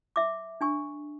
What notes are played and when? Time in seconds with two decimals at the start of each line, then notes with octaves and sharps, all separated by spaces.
0.16 E5 D6
0.61 D4 G#5 C#6